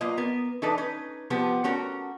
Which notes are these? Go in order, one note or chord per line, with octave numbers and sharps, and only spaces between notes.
F#3 A#3 F4 B4 D#5
B3 A#4
E3 D4 D#4 A4 B4 D#5
C#4 D#4 B4
C3 F3 B3 G4
A3 C#4 F#4 A#4